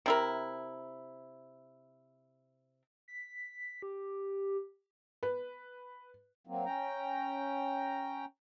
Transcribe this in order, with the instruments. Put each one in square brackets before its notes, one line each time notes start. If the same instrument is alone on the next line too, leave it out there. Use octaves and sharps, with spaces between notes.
[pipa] C3 E4 A#4
[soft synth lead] B6
G4
[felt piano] B4
[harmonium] F#3 A#3 C4
C#4 G5 A#5